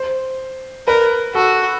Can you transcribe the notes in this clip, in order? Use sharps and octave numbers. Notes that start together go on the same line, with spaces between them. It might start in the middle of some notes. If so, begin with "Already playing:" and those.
Already playing: C5
A#4 B4
F#4 A4